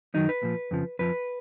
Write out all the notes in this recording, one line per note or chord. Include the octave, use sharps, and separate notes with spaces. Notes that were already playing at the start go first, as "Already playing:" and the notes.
F#2 D#3 F#3 D#4
B4
A#2 F3
F2 C#3 F3
F2 F3 B4